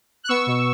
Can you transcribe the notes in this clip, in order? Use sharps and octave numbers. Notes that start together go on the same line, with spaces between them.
F#6
B3 C#6 E6
B2